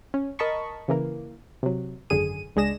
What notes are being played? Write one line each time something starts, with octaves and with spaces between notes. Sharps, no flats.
C#4
A#4 D#5 A5 B5 C#6
C#3 E3 A#3
C3 F#3
G#1 F#2 D3 G#4 D#7
C#2 G#3 D4 G#4 A#6 E7